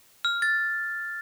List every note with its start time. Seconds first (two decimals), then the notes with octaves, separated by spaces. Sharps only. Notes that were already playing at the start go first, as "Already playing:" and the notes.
0.25 F6
0.42 A6